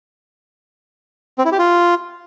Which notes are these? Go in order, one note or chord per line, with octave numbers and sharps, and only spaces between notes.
C4
E4
G4
F4